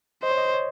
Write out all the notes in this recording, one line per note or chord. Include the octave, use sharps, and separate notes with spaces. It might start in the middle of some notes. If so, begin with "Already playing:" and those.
C5 D#5
C#5
D#5
C#5